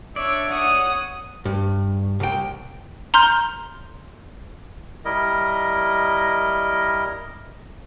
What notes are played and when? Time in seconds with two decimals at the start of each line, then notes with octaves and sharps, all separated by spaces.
0.16 D4 C#5 D5 E5
0.50 C#5 F#5 D#6
1.45 G2
2.20 C2 G5
3.14 A#5 C6 F6 G6
5.05 G3 E4 A#4 D#5